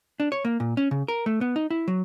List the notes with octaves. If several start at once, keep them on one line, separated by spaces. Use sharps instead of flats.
D4
C#5
A#3
A#2
C#4
C#3
A#4
A3
B3
D#4
E4
F#3